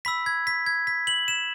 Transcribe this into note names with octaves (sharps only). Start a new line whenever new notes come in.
B5 E6 B6
G#6
B6
G#6
B6
F#7
E7